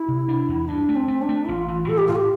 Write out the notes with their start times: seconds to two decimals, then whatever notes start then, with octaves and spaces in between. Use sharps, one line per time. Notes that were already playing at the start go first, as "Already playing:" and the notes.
Already playing: E4
0.08 C3
0.28 D4
0.49 E2
0.68 G2 D4
0.89 A3
0.95 C4
1.08 A3
1.22 D4
1.29 A3
1.48 A1 F4
1.68 E3
1.88 A2 A4
1.98 G4
2.07 A2 F4
2.16 G4